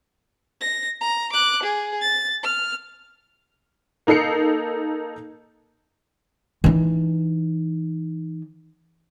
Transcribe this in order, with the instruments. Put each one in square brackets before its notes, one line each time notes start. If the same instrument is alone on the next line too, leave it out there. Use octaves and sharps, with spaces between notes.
[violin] A#6
A#5
D6 F#6
G#4
A6
F6
[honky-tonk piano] A#3 D#4 A4 C7 C#7
[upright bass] E3 D#4